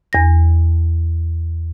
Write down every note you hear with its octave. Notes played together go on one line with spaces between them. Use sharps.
E2 A#6